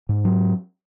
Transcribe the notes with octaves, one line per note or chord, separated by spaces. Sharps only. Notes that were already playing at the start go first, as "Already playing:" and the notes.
G#2
F#3